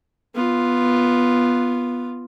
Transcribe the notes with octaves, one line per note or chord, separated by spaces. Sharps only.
B3 F4